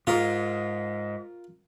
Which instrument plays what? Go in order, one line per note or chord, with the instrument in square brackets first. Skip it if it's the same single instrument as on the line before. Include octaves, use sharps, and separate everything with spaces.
[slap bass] G#2 [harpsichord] F4 A#4